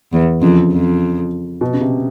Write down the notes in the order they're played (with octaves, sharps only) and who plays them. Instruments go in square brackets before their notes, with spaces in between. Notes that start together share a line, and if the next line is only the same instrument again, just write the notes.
[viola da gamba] E2
[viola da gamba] F2 [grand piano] C#3
[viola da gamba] F2
[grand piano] B2
C#3
C3